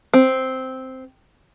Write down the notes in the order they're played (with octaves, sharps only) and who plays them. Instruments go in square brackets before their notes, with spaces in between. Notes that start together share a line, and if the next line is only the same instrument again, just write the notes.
[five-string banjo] C4